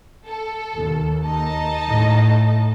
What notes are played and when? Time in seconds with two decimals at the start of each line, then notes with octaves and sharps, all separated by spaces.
0.25 A4
0.73 D#2
1.24 D#4 D#5 A5
1.90 A2